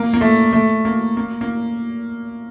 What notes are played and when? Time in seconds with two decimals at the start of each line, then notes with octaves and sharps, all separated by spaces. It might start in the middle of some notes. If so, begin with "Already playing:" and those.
Already playing: A#3
0.13 A#3
0.21 A3
0.53 A3
0.85 A#3
1.17 A#3
1.41 A#3